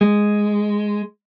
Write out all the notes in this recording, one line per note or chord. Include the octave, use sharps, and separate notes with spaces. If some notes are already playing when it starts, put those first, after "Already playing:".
G#3